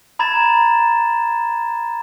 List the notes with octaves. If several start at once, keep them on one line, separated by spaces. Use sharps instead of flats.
A#5 B5 G#6 A6 E7